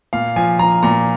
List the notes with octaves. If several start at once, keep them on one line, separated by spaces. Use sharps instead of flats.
A#2 F5
F3 G#5
F3 A#5
A#2 A#5